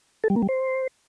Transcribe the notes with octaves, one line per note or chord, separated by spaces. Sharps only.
A4
G3
A#3
G3
C5